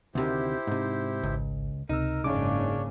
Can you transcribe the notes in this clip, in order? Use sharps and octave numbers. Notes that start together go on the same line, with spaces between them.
D2 C3 D#3 E4 G4 C5
G#2 C3 D#4
G#1 C#2
C#2 C3 D#4 A#4 E6
F#1 G#2 C#3 D4 C#5 D6